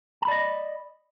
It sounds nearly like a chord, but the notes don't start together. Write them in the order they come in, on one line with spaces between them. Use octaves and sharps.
A5 B5 D5 D#5